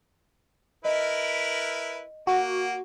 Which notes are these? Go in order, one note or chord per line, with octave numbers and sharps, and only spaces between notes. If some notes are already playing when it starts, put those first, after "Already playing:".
E4 A#4 B4 D#5
A#3 F#4